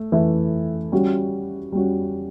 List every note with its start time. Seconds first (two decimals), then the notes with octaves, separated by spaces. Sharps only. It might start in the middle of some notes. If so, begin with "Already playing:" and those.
Already playing: A3
0.12 E3 A3 E4
0.92 G3 C#4 F#4
1.72 G3 C#4 F#4